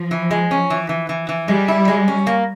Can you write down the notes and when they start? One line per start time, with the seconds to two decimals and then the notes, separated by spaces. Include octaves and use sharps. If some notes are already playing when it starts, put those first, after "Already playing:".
Already playing: F3
0.11 E3
0.31 G#3
0.51 C#4
0.70 E3
0.89 E3
1.09 E3
1.29 E3
1.48 G3 G#3
1.68 E4
1.88 G#3
2.08 C#4
2.27 A#3